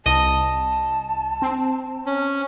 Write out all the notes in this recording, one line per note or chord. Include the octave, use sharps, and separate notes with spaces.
C2 D#5 A5
C4
C#4